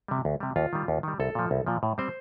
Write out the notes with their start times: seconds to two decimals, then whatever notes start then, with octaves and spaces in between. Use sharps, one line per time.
0.08 C3 G3
0.25 D2
0.40 C3 G3
0.56 D#2 F4
0.73 D#3 G3
0.88 D#2
1.03 D#3 G3
1.20 C2 A4
1.35 A#2 F3
1.51 C2
1.66 A#2 F3
1.83 A2
1.98 G3 C4 C5